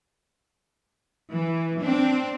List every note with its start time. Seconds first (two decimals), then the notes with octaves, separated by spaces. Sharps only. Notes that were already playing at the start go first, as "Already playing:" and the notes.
1.30 E3
1.78 C4 D4